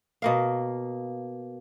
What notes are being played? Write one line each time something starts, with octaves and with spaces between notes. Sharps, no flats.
B2 A#3 F5